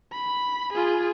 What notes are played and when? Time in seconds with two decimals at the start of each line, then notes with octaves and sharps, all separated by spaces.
0.12 B5
0.73 F4 G#4